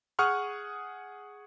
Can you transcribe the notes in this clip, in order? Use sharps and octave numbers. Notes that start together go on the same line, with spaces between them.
G#4 F#5 C#6 D#6 F6 F#6